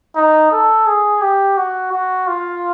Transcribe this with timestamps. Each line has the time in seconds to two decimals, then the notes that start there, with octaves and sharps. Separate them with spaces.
0.16 D#4
0.52 A4
0.87 G#4
1.21 G4
1.57 F#4
1.92 F#4
2.27 F4